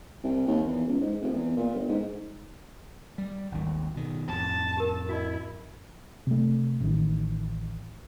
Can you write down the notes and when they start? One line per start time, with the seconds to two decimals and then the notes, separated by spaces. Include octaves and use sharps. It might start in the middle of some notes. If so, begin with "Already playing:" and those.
0.24 C2
0.47 D#2
0.67 E2
0.87 C#2
1.01 G#2
1.22 F1
1.33 E2
1.57 A#2
1.74 G1
1.89 G#2
3.18 G3
3.52 G#1 D#2
3.95 B2 D#3
4.29 F2 A2 A5
4.77 G4 A#4
5.09 E4 F#4 D#5
6.27 C3 A3
6.80 A1 D#3